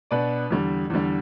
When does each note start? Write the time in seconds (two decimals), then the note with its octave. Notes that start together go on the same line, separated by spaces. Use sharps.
0.11 B2 B3 D4 B4 D5
0.51 E2 D3 G3
0.90 E2 D3 G3